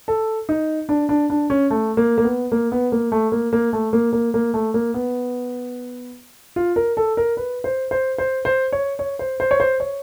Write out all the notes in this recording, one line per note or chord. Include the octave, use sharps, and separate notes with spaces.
A4
D#4
D4
D4
D4
C#4
A3
A#3
A#3
B3
A#3
B3
A#3
A3
A#3
A#3
A3
A#3
A#3
A#3
A3
A#3
B3
F4
A#4
A4
A#4
B4
C5
C5
C5
C5
C#5
C#5
C5
C5
C#5
C5
C#5